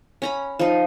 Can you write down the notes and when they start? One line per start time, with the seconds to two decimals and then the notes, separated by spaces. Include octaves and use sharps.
0.22 C#4 A#5 B5
0.59 F3 D#4 F4